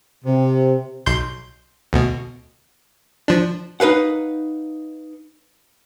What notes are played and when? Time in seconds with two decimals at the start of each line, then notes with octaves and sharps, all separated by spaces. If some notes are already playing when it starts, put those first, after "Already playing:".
0.25 C3
1.06 B1 C6 G6
1.93 D2 B2
3.28 F3 D4
3.80 D#4 B4 F5 F#5